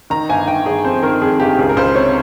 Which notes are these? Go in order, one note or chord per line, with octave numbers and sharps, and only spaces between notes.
D#3 A#5
G1 G#5
G1 G5
G1 G#4
F2 C5
D#3 A#4
F2 G#4
G1 G4
G4
C#2 G#4
A#4
C#2 C5
C3 C#5